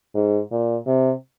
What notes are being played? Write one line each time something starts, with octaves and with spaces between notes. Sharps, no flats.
G#2
A#2
C3